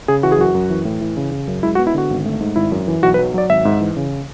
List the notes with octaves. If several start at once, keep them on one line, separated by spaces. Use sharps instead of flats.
C#3 G#4
E3 F#4
G#4
F#2 F#4
F#2
E3
A2
E3
C#3
C#3
F#2
G#3 E4
F#4
B3
E4
D3 F#4
G#1
A3
G#2
G#1 E4
F#2
E3
B1 F#4
B4
F#3
F#3 D5
G#1 E5
G#2
E3
C#3